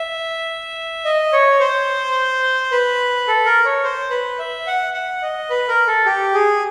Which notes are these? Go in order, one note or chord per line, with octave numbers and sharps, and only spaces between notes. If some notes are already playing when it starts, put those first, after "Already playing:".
Already playing: E5
D#5
C#5
C5
B4
A4
A#4
C#5
C5
B4
E5
F#5
F#5
D#5
B4
A#4
A4
G4
G#4